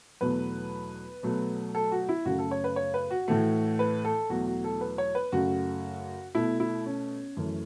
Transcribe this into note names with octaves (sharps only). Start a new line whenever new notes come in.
E2 B2 F#3 A3 B4
B2 F#3 A3
A4
F#4
E4
F#2 C#3 A3 F#4
A4
C#5
B4
C#5
B4
F#4
A2 E3 A3
B4
A4
E2 B2 F#3 A3 F#4
F#4
A4
B4
C#5
B4
F#2 C#3 A3 F#4
B2 A3 E4
E4
C#4
F#2 E3 A3